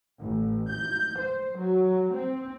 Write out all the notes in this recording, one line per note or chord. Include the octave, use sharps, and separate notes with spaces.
A1
G6
C5
F#3
C4